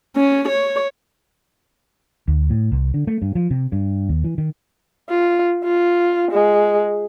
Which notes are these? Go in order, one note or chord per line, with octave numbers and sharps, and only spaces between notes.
C#4
C#5
D2
A2
C2
D3
A3
G2
F3
C3
G2
D#2
E3
D#3
F4
F4
G#3